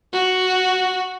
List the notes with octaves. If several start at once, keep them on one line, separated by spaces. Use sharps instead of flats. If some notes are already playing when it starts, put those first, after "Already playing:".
F#4